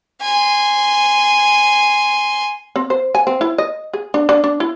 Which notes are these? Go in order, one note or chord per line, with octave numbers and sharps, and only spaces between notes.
G#5 C6
C4
C5
G#5
C4
E4
D#5
G#4
D4
D4
D4
E4